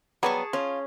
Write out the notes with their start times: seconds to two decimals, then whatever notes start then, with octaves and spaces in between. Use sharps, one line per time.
0.23 F#3 G3 B3 G#4 A5 C#6
0.53 C#4 F4